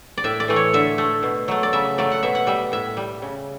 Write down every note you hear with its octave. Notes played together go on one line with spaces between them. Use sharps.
D5
A2 E5
D5
E3 A3
C#5
D3 E5
A3
B2
F#3 A3
D5
C#3 E5
F#3 A3 D5
F#5
B2 E5
F#5
G3 E5
A2 E5
G3
C#3